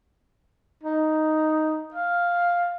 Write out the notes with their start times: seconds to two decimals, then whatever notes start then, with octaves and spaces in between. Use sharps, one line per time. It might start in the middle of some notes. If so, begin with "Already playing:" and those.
0.83 D#4
1.94 F5